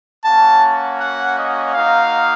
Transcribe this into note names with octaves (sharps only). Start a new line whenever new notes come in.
A#3 C#4 F#4 A5
F#5
D#5
A#3 D#4 F#4 F5